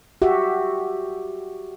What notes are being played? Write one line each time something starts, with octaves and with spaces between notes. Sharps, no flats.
F#4 G4 E5